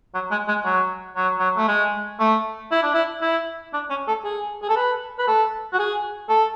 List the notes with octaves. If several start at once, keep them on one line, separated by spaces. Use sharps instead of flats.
F#3
G#3
G#3
F#3
F#3
F#3
A3
G#3
A3
E4
D4
E4
E4
D4
C#4
A4
G#4
G#4
A4
B4
B4
A4
F#4
G#4
A4